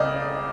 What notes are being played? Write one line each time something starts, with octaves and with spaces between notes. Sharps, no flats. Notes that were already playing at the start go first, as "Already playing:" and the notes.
Already playing: C#2 C#3 D5 D#5